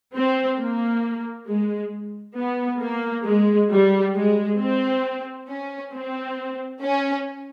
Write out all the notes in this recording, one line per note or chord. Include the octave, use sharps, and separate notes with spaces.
C4
A#3
G#3
B3
A#3
G#3
G3
G#3
C4
C#4
C4
C#4